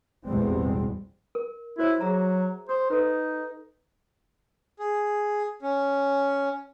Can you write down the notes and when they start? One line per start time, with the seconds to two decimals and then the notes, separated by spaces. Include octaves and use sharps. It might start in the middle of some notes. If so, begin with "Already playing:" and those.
0.25 A1 E2 B2 G3 G#3 C4
1.35 A#4
1.79 E4 F#4 C5 C#5
2.01 F#3 G#4 E5 A#5
2.69 C5 D#6
2.90 D#4 A4 B4
4.79 G#4
5.62 C#4